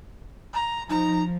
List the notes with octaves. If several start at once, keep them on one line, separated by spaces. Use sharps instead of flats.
A#5
F3 D#4 A#5